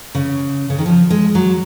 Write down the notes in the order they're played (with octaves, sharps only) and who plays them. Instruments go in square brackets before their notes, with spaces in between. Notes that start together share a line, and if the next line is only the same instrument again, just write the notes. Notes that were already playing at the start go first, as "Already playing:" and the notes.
[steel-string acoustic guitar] C#3
C#3
D#3
F3
G#3
F#3